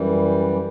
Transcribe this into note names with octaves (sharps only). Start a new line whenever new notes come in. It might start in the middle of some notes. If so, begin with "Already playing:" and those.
Already playing: F#2 E3 G3